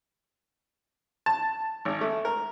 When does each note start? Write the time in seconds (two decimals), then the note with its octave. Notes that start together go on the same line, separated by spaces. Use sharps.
1.26 A5
1.85 G#1
2.01 A3
2.25 A#4